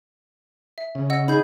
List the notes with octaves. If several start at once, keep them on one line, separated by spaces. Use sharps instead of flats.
E5
C#3
D#5 F#5 E6
D#4 G#4 B5 G6